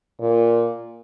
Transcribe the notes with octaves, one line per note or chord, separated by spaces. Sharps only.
A#2